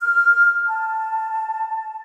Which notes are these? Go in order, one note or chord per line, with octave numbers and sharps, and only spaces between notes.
F6
A5